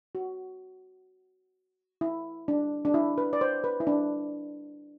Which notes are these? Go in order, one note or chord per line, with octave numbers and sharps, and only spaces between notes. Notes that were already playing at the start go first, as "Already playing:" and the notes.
F#4
E4
D4
D4
E4
B4
D5
C5
B4
E4
D4